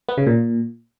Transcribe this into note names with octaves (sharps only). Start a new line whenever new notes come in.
B3
C#3
A#2